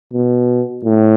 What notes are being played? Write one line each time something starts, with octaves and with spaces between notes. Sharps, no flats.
B2
A2